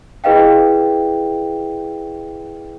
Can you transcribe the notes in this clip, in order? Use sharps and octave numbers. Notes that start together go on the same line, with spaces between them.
E4 G#4 B4 D#5 F5 G5